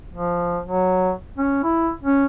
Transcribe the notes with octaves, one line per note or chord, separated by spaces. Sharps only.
F3
F#3
C#4
E4
C#4